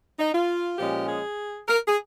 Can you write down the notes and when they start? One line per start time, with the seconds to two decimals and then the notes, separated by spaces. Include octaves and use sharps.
0.19 D#4
0.34 F4
0.78 A#2 F3 G#3 C#4 G4
1.08 G#4
1.68 A#4
1.88 G#4